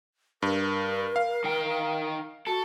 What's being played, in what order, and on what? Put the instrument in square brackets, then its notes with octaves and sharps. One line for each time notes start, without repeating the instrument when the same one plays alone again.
[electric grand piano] G2 [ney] A#4
[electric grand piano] F5
[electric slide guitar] D#3 G5
[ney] F#4 [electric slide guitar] A4